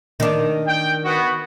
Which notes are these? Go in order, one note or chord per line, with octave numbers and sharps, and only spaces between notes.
D#3 D4
G5
B3 F#4